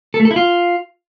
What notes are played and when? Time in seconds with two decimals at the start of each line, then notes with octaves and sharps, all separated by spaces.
0.14 A4
0.20 A3
0.25 A4
0.31 E4
0.36 F4